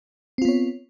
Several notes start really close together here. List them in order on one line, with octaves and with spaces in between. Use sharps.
C4 F4 B3 C#5